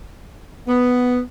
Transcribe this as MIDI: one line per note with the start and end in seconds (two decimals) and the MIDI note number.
0.68 1.19 59